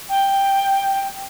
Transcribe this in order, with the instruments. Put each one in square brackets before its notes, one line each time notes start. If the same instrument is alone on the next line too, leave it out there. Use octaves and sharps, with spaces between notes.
[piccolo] G5